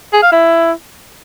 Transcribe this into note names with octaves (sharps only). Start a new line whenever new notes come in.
G#4
F5
E4